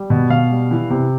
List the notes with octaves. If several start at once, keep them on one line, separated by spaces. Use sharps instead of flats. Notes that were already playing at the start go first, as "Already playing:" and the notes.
Already playing: G3
B2
B2 F5
G3
E3
C3